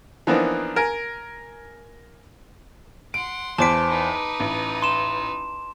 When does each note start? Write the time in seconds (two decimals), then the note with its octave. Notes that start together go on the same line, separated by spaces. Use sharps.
0.27 E3 F3 A#3 B3 D4 D#4
0.76 A#4 G#5
3.14 F#5 C6 D7
3.58 E2 B3 C5 A5 D6 B6 D7
3.88 D#4 B4
4.40 A1
4.82 C6 E7